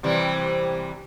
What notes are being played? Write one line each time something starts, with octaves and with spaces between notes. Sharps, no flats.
C3 E3 G3